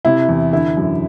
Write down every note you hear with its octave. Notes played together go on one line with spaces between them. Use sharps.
C3 E4
E2
D3 E4
F#2